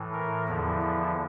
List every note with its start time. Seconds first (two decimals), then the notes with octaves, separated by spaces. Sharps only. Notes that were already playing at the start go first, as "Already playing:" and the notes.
Already playing: A2 E3
0.13 A#4
0.47 E2 D3 F3 E4
0.81 E4